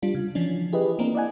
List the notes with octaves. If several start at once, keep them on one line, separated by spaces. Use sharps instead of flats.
G3 D4 F4
C#3
E3 F3 C#4 D4
E4 G4 G#4 B4 D#5
A#3 C4 D4 E4 A#4
D5 D#5 F#5 G#5